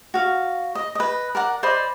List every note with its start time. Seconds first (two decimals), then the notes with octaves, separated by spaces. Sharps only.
0.14 F#4 F5
0.75 D#5
0.95 B4 D#5
1.35 A#4 D5 F#5
1.63 C5 D5 D#5 B5